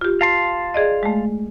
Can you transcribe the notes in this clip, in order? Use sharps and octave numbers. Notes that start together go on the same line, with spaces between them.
F4 G4
F5 A5 C6
G#4 D5 D#5
G#3 A3